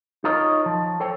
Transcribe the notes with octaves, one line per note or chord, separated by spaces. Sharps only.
D#4 F4 A#4 C#5 D#5
F3
A4 C5 C#5 G5